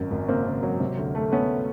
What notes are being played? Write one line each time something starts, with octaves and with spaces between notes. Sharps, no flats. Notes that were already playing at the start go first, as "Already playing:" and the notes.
Already playing: G#1 F#2
G#1
C#3 A#3 C4
C#3
F#3
C3
D2
A3
A3 B3 C#4